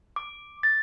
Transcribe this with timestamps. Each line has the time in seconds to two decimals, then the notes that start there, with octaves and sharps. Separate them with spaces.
0.16 D6
0.63 A6